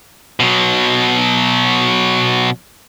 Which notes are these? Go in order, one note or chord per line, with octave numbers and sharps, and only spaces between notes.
B2 F#3